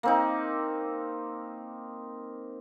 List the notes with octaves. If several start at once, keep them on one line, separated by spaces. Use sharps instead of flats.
A#3 C4 D#4